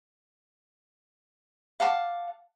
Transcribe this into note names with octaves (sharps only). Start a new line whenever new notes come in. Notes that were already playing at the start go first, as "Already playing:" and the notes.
F5 F#5 A5 D6